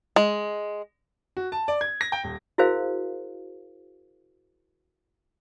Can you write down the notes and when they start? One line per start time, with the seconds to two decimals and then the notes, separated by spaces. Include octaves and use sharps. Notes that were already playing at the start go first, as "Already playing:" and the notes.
0.16 G#3
1.37 F#4
1.52 A5
1.68 D5
1.81 G#6
2.01 A#6
2.12 G5
2.24 D#1
2.58 E4 F#4 G#4 A#4 C5 F5